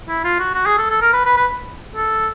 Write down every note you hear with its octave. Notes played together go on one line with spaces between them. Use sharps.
E4
F4
F#4
F#4
G#4
A4
A4
A#4
B4
B4
B4
A4